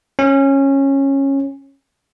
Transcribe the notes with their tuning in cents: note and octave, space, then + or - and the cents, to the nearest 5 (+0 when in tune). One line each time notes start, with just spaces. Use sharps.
C#4 -15